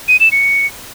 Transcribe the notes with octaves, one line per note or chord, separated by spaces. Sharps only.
D#7
E7
C#7